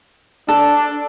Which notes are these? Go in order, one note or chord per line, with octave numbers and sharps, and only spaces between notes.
D4 A4